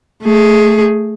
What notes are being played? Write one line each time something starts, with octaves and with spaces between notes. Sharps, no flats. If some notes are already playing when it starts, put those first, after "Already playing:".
A3 G#4